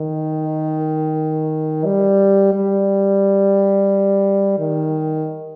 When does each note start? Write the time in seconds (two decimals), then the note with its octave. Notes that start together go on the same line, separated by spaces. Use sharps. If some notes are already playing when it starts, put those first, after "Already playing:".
Already playing: D#3
1.85 G3
2.54 G3
4.59 D#3